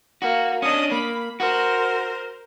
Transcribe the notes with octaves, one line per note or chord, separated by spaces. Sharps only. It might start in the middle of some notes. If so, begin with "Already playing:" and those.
A#3 F#4
C#4 D4 D#5 D#6
A#3 B5
F#4 A#4 C5